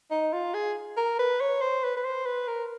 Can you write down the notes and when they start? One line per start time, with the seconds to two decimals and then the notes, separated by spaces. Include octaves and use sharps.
0.11 D#4
0.33 F4
0.54 G#4
0.97 A#4
1.19 B4
1.41 C#5
1.61 C5
1.84 B4
1.96 B4
2.05 C5
2.26 B4
2.48 A#4